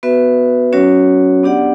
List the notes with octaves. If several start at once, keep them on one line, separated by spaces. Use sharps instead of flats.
B3 F#4 B4 E5
F#3 C#4 F#4 C#5
B3 D4 G4 D5 F#5